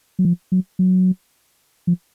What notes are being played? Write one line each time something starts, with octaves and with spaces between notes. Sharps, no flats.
F#3
F3
F#3
F#3
F3